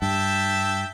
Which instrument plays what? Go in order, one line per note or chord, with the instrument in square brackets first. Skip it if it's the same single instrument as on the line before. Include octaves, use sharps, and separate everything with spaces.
[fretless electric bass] G2 [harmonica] E5 G5 A5